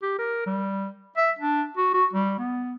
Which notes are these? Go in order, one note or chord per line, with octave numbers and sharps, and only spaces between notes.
G4
A#4
G3
E5
D4
F#4
F#4
G3
B3